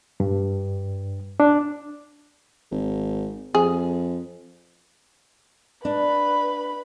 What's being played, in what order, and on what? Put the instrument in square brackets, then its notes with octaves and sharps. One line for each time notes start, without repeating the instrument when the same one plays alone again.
[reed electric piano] G2
D4
[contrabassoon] G#1
[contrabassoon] F2 [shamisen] G#4
[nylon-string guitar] D4 [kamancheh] B4 B5